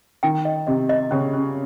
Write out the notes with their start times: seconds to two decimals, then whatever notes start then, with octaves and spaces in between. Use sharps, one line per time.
0.23 D#3 G5
0.45 D#5
0.67 C3 D#5
0.89 D#5
1.11 C#3 C#4
1.34 C#4